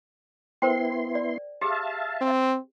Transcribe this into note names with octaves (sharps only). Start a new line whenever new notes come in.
B3 E4 A#4 C5 G5 C6
D5
G4 G#4 E5 F5 A5
C4